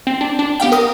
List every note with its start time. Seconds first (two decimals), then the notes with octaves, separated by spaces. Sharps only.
0.07 C4
0.21 D4
0.39 D4
0.60 B3 G4 F5 G5
0.72 A#4 D#6